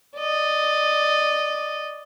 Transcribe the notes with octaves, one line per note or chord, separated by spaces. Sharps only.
D5 D#5